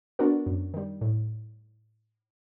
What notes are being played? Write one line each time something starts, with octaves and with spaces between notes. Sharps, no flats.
B3 D4 F#4 A#4
F#2
D#3 G3
A2